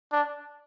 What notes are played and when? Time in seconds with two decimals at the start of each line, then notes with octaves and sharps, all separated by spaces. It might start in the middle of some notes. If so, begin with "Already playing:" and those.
0.12 D4